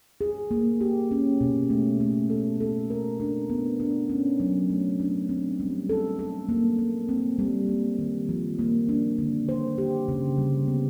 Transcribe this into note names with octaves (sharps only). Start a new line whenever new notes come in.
G#4
A#3
G4
C#4
B2
A3
A3
A4
A4
A#4
D4
B3
D4
C#4
F#3
A3
D4
C4
G3
A4
A4
A#3
A#3
C4
G3
A#3
D#3
F3
A#3
D4
D3
C5
G4
C#3
G3
B3